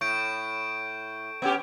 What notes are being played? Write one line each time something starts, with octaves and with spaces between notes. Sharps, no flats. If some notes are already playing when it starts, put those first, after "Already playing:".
A2 C#6 G6 D7
B3 C#4 G4